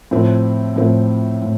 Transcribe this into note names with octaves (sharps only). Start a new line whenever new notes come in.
A2 F3 C4
A2 F3 C4
A2